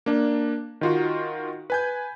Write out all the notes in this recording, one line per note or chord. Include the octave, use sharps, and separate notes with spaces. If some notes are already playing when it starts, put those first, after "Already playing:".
A#3 D4
D#3 F4 F#4
B4 G#5 G6